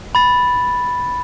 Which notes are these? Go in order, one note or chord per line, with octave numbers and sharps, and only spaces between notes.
B5 A6